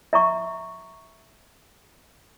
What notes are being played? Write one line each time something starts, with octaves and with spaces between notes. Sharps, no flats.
E5 A#5 C#6